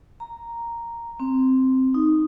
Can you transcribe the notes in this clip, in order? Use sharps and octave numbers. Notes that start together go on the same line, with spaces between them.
A#5
C4
D#4